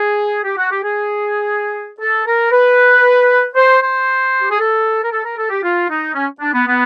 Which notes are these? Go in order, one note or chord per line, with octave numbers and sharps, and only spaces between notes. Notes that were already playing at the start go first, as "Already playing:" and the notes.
Already playing: G#4
G4
F#4
G4
G#4
A4
A#4
B4
C5
C5
G4
G#4
A4
A#4
A4
A#4
A4
G4
F4
D#4
C#4
D4
B3
B3